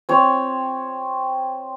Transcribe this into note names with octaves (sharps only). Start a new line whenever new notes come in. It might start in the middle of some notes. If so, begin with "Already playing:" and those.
C4 C#5